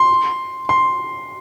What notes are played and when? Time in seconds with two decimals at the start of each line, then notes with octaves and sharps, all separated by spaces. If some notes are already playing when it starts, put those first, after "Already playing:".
Already playing: C6
0.69 C6